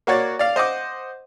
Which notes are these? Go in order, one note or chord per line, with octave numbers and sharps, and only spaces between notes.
A#3 F#4 C#5 D5
D5 F5
C5 D#5 F#5 D6